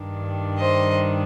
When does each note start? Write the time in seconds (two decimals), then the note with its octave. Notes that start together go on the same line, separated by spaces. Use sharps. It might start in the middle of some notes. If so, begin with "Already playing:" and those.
Already playing: G2 D#3 G3 D4
0.59 C5 D#5